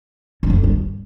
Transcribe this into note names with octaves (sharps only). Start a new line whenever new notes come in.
F#2
F2
G2